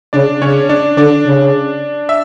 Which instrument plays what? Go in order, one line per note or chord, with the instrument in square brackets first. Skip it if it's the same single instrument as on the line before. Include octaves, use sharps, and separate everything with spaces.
[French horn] C#3 [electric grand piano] D4 D5
[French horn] C#3 [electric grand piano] C#4 C#5
[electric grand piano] D4 D5
[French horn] D3 [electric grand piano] D4 D5
[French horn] C#3
[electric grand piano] E5